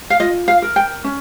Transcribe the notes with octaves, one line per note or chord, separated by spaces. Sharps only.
F5
F4 D#5
F5
A#4
G5
C#4